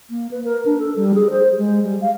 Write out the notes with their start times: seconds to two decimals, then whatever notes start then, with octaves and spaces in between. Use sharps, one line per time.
0.10 A#3
0.31 B4
0.45 A#4
0.66 D4
0.80 A4
0.96 G3
1.14 G#4
1.31 C5
1.57 G#3
1.83 G3
2.01 F5